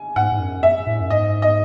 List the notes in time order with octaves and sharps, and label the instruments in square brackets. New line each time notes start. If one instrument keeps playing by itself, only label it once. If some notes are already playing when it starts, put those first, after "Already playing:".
Already playing: [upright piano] G#5
[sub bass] G#2 [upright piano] F#5
[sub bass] G#2
F#2
[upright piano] E5
[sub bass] A2
F#2
[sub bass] G#2 [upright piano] D#5
[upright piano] D#5